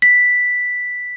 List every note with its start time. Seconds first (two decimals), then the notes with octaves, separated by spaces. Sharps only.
0.02 B6